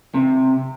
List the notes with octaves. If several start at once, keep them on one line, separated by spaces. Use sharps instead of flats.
C3